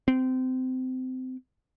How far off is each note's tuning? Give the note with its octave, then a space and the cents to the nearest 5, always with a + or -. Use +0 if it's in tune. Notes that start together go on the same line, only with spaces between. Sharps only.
C4 -25